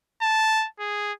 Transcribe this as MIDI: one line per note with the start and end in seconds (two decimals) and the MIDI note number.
0.22 0.67 81
0.80 1.13 68